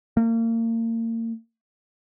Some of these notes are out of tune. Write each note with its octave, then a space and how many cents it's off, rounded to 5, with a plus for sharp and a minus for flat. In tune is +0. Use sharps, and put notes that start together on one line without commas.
A#3 -35